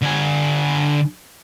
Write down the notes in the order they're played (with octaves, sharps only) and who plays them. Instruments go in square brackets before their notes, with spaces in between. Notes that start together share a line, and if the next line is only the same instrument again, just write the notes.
[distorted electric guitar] D3 G#5